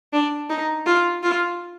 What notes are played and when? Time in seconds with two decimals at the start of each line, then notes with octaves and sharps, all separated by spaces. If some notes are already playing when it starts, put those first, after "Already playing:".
0.13 D4
0.50 D#4
0.86 F4
1.23 F4